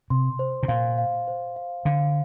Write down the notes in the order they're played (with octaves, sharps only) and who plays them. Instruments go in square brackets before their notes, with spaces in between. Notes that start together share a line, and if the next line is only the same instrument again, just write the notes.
[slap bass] C3 [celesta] C6
[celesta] C5
[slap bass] C3
[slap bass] A#2 [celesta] F5
[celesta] F5
C5
F5
[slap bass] D3 [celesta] F5